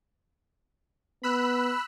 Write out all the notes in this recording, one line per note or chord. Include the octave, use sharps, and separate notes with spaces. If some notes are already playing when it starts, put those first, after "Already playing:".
B3 B5 E6 F#6